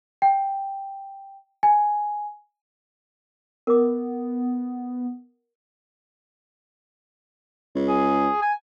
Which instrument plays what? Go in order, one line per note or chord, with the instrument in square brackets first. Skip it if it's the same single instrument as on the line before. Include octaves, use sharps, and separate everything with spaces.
[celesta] G5
G#5
[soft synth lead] B3 [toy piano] A#4 D6
[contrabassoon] C#2
[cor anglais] G#4
G#5